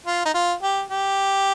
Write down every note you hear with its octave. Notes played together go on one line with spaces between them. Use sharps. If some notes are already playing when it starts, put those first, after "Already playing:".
F4
D#4
F4
G4
G4